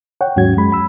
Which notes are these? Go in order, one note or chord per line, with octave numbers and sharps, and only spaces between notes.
C#5 F#5 G5
D#2 G#2 F#3 C#4 F#4 G#6
F#2 G#3 B5
B5 E6